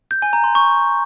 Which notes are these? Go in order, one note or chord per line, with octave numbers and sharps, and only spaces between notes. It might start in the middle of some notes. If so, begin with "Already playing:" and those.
G6
G#5
A#5
C6
C#6